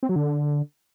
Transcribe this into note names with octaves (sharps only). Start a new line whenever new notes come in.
C4
F#3
D3